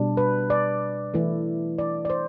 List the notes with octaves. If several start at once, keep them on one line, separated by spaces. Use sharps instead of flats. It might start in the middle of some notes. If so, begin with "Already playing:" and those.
Already playing: B2 G3 D4
B4
D5
E3 A3 E4
D5
D5
C5